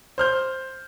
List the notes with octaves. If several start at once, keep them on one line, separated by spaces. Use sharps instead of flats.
C5 F6 G6